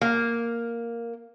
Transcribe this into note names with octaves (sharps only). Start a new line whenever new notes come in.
A#3